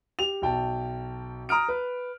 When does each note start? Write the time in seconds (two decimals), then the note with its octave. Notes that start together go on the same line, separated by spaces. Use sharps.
0.19 G4 F7
0.42 B1 G5 A5
1.49 A#5 D#6 F6 D7
1.68 B4